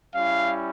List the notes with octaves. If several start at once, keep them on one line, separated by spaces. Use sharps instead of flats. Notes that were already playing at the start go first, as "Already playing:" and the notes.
G3 C#4 E4 F5